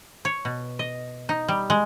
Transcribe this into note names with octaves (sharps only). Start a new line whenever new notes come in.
C#5
B2
D#5
D#4
G3
G#3